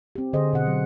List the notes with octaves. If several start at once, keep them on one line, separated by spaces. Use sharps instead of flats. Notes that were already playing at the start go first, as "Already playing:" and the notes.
C4 G4
D3 G#4 C5 D#5
B2 F#5
F#3